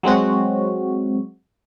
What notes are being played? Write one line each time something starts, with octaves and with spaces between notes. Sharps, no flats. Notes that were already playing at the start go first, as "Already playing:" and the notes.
F#3 G#3 C4 F#4